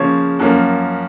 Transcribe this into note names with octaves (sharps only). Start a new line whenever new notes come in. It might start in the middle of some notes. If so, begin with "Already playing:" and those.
Already playing: C#3 F3 A#3 C#4 C#5
F#2 F3 A#3 C#4